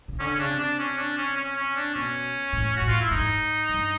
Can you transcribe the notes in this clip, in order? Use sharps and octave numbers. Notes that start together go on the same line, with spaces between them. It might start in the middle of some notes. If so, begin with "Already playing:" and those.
C#3
D3 C#4
C#4
C#3 D4
C3
D4
C#4
D4
C#4
C#4
C#4
D4
B2 C#4
A2
F#4
A2
F4
E4
G#2 D#4
G2